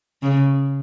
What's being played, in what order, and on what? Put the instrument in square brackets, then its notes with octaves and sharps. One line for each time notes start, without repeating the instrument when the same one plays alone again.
[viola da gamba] C#3